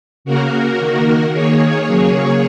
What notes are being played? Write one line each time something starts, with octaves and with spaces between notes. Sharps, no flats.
C#3 A#3 F#4 A#4
D#3 A#3
D#3 A#3 G#4 C#5
C#3 F#3 A#3